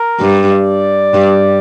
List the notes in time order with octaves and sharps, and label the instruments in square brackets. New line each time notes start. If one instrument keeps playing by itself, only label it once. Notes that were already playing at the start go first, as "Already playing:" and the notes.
Already playing: [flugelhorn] A#4
[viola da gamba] G2
[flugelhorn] D5
[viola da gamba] G2